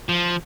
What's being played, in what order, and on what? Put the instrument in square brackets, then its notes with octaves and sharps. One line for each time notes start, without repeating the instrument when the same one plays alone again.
[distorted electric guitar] F3